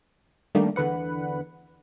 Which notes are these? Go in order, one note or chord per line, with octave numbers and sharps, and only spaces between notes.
D#3 G3 A3 A#3 D4
E2 D3 B4 F#5